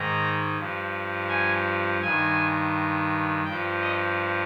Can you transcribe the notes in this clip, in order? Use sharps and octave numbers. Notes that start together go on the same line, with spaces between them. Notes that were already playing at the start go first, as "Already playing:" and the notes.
Already playing: G#2 D#3 A#5
G2 F3
G#5
G2 D#3 G#5
G2 F3 G5
D#5